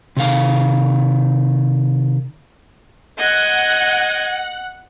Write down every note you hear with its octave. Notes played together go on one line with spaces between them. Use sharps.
C3 D#3 F5
D#5 F#5 G#6